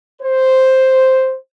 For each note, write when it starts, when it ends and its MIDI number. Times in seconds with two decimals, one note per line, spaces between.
0.22 1.36 72